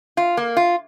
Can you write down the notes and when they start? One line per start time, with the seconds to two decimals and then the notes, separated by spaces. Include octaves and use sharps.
0.17 F4
0.37 A#3
0.57 F4